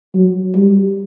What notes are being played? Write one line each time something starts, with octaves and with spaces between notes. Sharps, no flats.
F#3
G3